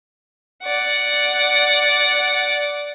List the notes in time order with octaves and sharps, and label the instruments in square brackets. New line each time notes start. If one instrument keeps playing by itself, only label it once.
[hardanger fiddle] D5 F#5